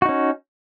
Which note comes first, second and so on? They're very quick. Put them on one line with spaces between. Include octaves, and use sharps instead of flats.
F#4 D#4 C#4